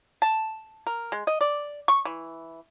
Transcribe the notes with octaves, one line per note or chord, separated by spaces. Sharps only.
A5
A#4
G#3
D#5
D5
C#6
E3